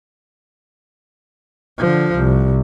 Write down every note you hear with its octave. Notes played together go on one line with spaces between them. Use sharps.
D3 F3
C2